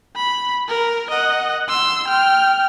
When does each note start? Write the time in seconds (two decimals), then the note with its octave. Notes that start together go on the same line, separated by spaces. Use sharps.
0.16 B5
0.68 A#4
1.10 D#5 F#5
1.69 C6 E6
2.07 G5 F6